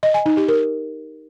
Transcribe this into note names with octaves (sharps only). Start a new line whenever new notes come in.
D#5
G#5
D#4
G4
A#4